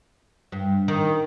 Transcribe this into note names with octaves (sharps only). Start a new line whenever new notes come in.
G2
D#3